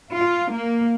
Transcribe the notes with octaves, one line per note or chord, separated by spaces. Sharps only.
F4
A#3